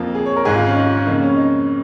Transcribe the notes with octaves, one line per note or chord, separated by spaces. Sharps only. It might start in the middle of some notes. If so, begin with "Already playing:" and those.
Already playing: F2 F3 A#3
G#4
C#5
A#4
G#1 G#2 G#3 G#4
F4
C#4
D#4
F4
C#4
F2 C#3 A#3 D#4
C#4
D#4